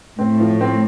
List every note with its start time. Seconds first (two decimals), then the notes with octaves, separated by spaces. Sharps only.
0.19 A2 C4
0.40 F3
0.61 C4